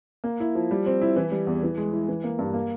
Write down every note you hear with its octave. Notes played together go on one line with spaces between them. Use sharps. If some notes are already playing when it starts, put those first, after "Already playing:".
A#3
E4
F3
G3
C4
E4
E3
G3
E2
E3
G#3
E4
E3
A#3
G2
A#3